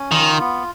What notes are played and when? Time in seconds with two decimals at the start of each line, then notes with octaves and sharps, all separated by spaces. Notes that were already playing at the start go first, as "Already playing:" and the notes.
Already playing: C#4
0.11 D#3 F4
0.40 B3